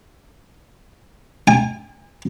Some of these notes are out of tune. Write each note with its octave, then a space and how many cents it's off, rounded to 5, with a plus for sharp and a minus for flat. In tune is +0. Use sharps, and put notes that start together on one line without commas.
G#5 -35